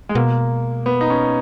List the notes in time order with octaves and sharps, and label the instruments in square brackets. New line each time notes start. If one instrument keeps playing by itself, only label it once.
[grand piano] G#3
[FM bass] B2 [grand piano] A#3
[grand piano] B3
D#4
C#4